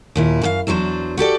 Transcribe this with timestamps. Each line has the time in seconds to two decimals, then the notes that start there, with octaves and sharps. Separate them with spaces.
0.16 D#2 A#2 E4
0.42 F#2 A4 F5
0.67 E2 F#3 D4 A4 C5
1.17 F#4 G4 A4 D5